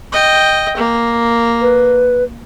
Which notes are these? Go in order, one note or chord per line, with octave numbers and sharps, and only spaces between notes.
D#5 G5
A#3
B4